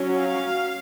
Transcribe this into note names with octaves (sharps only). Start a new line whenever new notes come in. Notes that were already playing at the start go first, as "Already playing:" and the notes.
Already playing: F#3 C#4
F5